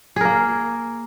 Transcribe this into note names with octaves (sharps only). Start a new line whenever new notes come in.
A#3 G#4 A#4